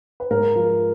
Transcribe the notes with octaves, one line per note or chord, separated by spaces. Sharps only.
B4
G#2 A#4
F3